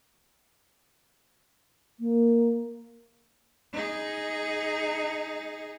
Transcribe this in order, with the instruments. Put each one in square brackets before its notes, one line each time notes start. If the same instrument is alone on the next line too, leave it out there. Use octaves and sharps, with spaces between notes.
[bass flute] A#3
[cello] D#4 G#4